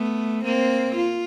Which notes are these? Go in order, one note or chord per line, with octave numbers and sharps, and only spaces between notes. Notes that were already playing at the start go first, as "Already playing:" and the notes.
Already playing: A3 B3
A#3 C4
F4